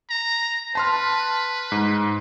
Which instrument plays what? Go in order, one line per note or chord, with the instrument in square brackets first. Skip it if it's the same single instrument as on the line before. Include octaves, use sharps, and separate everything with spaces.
[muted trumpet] A#5
[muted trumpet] B4 [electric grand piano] A5 C6 F6
[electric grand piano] G#2